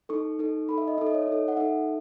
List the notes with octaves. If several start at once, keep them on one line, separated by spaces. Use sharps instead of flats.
D#4 A4 C#6
D#4 A4
D#4 A4 B5
E5
D#5
D#4 A4 E5
D#5
C#5
D#5
D#4 A4
F#5
D#4 A4 E5